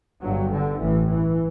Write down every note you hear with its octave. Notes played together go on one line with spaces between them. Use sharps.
G1 G2 F#3
D3
A1 A2 E3
E3